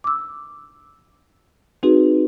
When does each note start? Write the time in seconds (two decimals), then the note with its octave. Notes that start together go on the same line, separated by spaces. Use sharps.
0.04 D6 E6
1.83 C4 D#4 F#4 G#4 B4